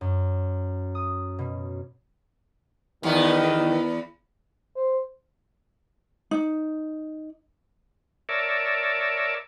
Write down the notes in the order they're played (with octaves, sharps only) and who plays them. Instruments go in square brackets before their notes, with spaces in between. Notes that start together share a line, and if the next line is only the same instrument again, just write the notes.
[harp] F#2
D#6
B2
[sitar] E2 B3 [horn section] D#3 G3
[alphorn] C5
[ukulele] D#4
[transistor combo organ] A#4 C#5 D5 E5 A5